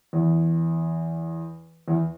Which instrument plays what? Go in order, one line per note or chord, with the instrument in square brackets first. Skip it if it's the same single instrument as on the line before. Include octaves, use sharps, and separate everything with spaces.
[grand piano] E2
E2